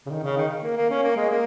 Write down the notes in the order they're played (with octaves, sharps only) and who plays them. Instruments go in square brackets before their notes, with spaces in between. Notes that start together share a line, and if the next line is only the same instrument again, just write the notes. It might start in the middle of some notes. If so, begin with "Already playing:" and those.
[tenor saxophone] C#3
D#3
C#3
D#3
A#3
A#3
C#4
A#3
G#3
A#3